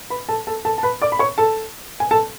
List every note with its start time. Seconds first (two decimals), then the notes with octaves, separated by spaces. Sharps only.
0.10 B4 B5
0.29 A4 A5
0.47 A4 A5
0.65 A4 A5
0.78 A5
0.83 B4 B5
1.02 D5 D6
1.12 B5
1.19 C#5 C#6
1.38 A4 A5
2.00 G#5
2.11 A4 A5